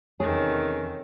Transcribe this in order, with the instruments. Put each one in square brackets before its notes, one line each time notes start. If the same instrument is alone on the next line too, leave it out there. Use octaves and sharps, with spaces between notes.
[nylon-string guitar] E2 G#4 [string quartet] C3 D#3 A3 [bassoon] C#4